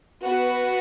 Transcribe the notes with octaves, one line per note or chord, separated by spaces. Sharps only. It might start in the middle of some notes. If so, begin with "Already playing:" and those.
B3 F#4 B4